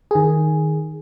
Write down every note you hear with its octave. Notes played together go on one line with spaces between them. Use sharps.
D#3 G#4